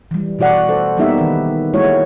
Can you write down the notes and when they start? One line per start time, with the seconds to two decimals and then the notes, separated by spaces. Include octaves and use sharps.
0.11 E3 G3
0.39 B2 E3 F#4 D5 F#5
0.69 A4 C5
0.97 G3 A#3 B3 D#4 G4 E5
1.18 D#3 E3 B4
1.74 G#3 A#3 E4 F#4 C#5